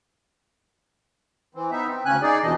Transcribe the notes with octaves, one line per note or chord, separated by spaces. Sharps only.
E3 C4
B3 D#4 E5
C4
D2 C#3 C#4 G#5 F#6
D#4 G#4 D5
D#2 B2 E3 D4 D#5